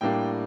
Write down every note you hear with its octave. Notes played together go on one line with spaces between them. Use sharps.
A2 G3 A#3 D4 G5